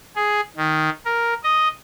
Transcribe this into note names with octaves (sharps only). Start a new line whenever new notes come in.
G#4
D#3
A#4
D#5